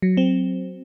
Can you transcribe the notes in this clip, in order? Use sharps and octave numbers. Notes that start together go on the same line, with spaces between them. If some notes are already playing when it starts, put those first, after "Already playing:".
F#3
C4